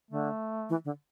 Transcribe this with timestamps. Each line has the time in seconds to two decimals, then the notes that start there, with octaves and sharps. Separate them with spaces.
0.11 D3 A3
0.69 E3
0.85 D3